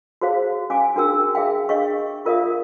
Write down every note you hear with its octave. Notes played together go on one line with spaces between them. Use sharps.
F#4 G#4 C5 F5
C#4 F5 G#5 D6
D4 F#4 G#4 A#4 G5 E6
G#4 E5 F5 G5
D4 G#4 D#5 F5 C#6
F4 A#4 D5 E5 F5 D#6